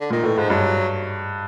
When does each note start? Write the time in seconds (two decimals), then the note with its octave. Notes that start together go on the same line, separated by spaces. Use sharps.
0.01 D3
0.10 A#2 D#3
0.23 A2 E3
0.37 G#2 F3
0.50 G2 F#3